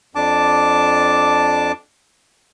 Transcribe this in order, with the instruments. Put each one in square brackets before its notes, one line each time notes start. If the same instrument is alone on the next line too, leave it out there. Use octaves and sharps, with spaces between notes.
[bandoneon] F2 D4 A5 D6